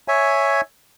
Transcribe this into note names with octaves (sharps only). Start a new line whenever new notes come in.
C#5 E5 G#5